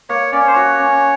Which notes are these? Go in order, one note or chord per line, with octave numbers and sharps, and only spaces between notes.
A#3 C#5
C#4 D5
C#5
C5
F#4 C#5
C#4